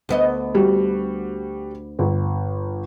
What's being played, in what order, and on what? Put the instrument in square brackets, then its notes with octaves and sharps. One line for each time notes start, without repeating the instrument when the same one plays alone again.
[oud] D2 B3 D#5
[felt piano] G3 F#4
G1